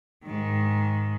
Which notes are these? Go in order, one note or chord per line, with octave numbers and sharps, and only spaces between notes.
G#2 D#3